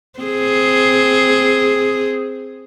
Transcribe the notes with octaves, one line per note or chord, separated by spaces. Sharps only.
C4 G#4